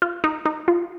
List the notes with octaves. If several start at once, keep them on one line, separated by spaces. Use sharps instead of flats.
F4
D#4
D#4
F4